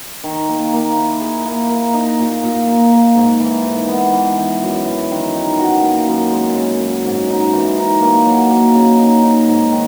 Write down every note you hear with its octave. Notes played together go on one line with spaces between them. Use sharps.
D#3
A#3
A#3
E4
G#4
A#3
A#3
D#4
A#2
A#2
A#2
A#3
G#2
E3
G#2
B3
E3
E3
F#2
E3
D#3
D#4
F#4
A#3
F#2
G#3
C#3
F#2
G#2
D#4
E3
D#4
A#3
F#3
A#3
C#3
D#4
D#4
G#2
D#3